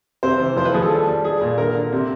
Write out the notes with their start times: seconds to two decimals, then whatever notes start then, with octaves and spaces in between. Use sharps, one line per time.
0.23 C3 C5
0.40 E3
0.56 F3 C5
0.65 B4
0.74 F3 G#4
0.82 A4
0.91 G3
1.08 G3
1.24 G3 G#4
1.41 A#2
1.58 D3 A#4
1.75 D3
1.92 C3